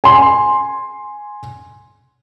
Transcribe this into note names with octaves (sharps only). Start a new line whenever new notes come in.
G#5 C6